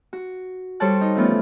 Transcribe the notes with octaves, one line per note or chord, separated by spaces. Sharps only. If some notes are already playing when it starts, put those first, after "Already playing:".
F#4
G3 A4 C5 C#5 A5 F#6
D#4
F2 E3 A3 B3 C#4 F4